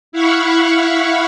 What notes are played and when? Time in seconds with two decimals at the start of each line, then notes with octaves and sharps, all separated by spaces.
0.12 E4 F5 F#5 B5 C#6